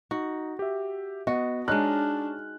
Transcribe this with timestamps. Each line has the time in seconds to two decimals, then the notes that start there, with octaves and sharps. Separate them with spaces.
0.11 D#4 F#4
0.59 G4 E5
1.27 B3 F#4 D#5
1.68 G#3 D4 D#4 C#5 A5 F6 F#6